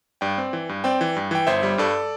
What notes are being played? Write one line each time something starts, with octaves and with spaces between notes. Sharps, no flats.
G2 D5 G5
C4
E3
G2
C4 D5 G5
E3
G2
E3 G5
G1 C5 E5
G3
G2 A4 D5